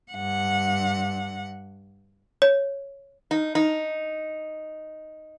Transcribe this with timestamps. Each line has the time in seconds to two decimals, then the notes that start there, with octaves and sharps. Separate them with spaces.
0.12 G2 F#5
2.42 C#5
3.31 D#4
3.55 D#4